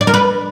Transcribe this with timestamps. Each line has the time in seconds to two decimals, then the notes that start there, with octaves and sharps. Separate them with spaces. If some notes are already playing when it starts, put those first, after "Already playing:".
0.01 D5
0.07 A#4
0.14 B4